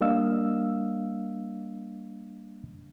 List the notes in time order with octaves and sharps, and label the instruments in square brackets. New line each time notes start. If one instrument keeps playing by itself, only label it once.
[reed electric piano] G3 A#3 D4 D#5 F5 E6